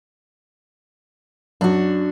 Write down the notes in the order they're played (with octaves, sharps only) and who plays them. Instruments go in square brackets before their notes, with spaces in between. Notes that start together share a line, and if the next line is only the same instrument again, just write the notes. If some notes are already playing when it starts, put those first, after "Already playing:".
[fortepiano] F#2 [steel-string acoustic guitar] D4 F#4